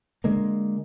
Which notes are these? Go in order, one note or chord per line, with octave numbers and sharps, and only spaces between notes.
D3 G#3 A#3